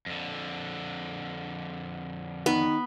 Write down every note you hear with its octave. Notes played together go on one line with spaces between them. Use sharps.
F2 D3
D#3 B3